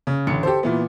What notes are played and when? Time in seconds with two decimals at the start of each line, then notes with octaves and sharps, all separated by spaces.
0.07 C#3
0.27 A1 D3 C#7
0.43 G4 A4 C5
0.63 A#2 E3 B3